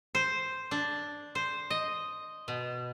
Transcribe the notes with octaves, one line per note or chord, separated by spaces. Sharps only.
C5
D4
C5
D#5
B2